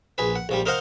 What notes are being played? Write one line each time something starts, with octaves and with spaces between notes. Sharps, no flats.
A#1 G#4 B4
F#5
A#1 F3 G3
D#4 A#4 C5 D#5 F5 F#5